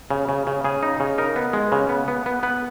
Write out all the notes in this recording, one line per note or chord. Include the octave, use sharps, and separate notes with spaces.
C#3
C#3
C#3
C#3 G#4
D#4
C#3
D#4 A#4
B3
G#3
C#3
B3
B3
B3
B3 B4